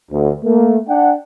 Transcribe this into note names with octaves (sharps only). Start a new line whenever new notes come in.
D2
A3 A#3
D4 F#5 G5